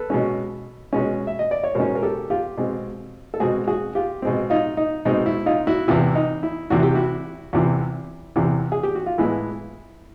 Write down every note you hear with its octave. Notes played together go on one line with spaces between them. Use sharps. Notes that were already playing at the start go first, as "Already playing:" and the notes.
Already playing: A4 B4
B2 G#3 C#4
B2 G#3 C#4
E5
D#5
D5
C#5
B2 G#3 C#4 A#4 C5
A#4
G4 A4
F4 G4
B2 G#3 C4
A4
B2 G#3 C4 F#4 G#4
F#4 G#4
F4 G4
B2 G#3 C4
D#4 F4
D#4
B2 G#3 C4 D#4
E4
D#4 F4
E4 F#4
E2 C3 E3 E4
D#4
E4
E2 C3 E3 F#4
G4
E4 F#4
E2 C3 E3 E4
E2 C3 E3
G#4
G4
F#4
F4
A2 E3 G#3 B3 E4